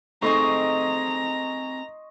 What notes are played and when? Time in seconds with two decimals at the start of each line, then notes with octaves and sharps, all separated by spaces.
0.22 A3 C4 D#4 G#4 D#5 A#5 C6 C#6